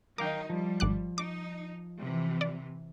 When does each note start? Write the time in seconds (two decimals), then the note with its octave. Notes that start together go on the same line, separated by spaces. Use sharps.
0.18 D#3 F#3 D#4 A#4 F5 G5 D6
0.50 F3 G3
0.80 G#1 D6 F#6
1.18 D#4 D6
2.00 C3 E3
2.41 D5